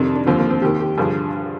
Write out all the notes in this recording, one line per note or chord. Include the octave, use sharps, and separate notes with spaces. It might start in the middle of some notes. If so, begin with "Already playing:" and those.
Already playing: F2 C3 D#3 D4
D4
D#2 D3 F3 C4
A#3
C4
D#2 D#3 G4
G4
G2 D3 F3 G#4